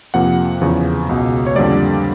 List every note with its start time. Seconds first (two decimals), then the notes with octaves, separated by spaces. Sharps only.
0.14 F2 C3 F3 A#3 F#5
0.61 E2 C#3 F3
1.09 C#2 B2 G#3
1.47 C#5
1.55 F2 D3 G3 A#3 D5